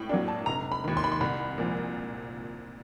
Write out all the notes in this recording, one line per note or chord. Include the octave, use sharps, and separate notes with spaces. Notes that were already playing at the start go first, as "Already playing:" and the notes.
Already playing: A2 G5
F#3 A#3 D4
A5
F1 A#5
B5
D#2 D#3
C6
B5
C6
C2 B5
A#2 F3